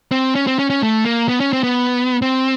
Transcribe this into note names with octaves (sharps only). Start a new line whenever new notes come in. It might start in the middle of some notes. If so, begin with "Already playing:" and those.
C4
C#4
C4
C#4
C#4
A3
A#3
B3
C#4
C4
B3
C4